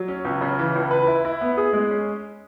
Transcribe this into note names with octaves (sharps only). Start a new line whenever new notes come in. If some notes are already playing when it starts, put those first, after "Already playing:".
Already playing: F#3
C#4
C#2
C#3
E3
C#2
B4
E4
E4
B3
G#4
G#3
C#4